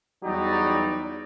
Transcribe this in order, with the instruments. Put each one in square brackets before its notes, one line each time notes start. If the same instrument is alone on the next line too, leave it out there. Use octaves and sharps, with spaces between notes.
[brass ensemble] E2 F#3 G3 D#4 G4 D5